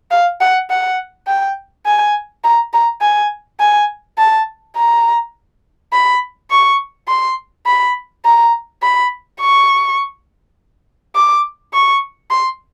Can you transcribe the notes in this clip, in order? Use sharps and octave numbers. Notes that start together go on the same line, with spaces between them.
F5
F#5
F#5
G5
G#5
A#5
A#5
G#5
G#5
A5
A#5
B5
C#6
C6
B5
A#5
B5
C#6
D6
C#6
C6